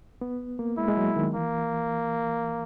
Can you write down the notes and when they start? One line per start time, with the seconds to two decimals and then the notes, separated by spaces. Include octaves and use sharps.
0.21 B3
0.59 A#3
0.78 G#3 E4
0.88 G#3
0.97 F#3
1.16 D#3
1.34 E3 A#3